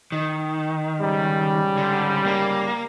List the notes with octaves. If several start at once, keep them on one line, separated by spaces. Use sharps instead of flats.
D#3
G#2 C#3 G3
D3
A#3